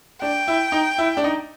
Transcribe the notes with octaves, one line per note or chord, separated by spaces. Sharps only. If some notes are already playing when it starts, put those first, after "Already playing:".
D4 G5
E4
D#4
E4
D4
D#4